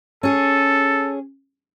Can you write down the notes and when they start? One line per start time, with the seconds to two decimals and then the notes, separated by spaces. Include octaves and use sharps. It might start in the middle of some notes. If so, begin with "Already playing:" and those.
0.23 C#4 G#4 A4